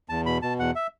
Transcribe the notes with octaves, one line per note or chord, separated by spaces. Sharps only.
E2 A5
B2 B5
B2 A5
E2 F#5
E5